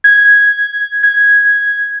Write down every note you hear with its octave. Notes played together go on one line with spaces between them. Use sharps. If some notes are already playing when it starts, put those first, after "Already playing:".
G#6
G#6